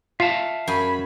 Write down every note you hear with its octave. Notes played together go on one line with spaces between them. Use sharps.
F4 E5 F5 A5
F#2 G#5 B5